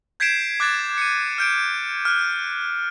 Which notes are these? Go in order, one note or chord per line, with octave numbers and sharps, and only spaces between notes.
G6 G#6 B6 C7 D7 E7
D6 F#6 G#6 A6
C#7 D#7
F6 G6 D7
F6 F#6